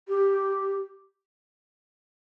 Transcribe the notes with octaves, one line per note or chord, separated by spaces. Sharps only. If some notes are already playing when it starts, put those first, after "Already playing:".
G4